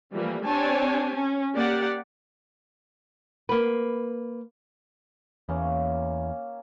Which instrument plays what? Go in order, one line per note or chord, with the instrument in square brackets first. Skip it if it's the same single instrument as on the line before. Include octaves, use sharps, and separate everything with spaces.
[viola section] E3 F3 G3 A3 A#3
C4 D4 G4 C#5 G#5 A5
C#4
A#3 G4 D5 F#5
[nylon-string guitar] A#3 B4
[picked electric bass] E2 [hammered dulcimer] A#3 C#4